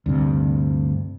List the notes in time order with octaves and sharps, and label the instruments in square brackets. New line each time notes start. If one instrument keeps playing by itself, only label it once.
[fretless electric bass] D2 G2 C3